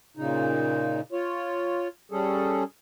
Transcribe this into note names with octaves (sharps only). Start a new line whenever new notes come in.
A#2 C#3 D#4
F4 C#5
G3 C#4 G#4 A4